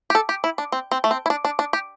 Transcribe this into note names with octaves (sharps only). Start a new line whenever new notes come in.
G4
A4
G4
E4
D4
C4
C4
A3
C4
E4
D4
D4
D4
G4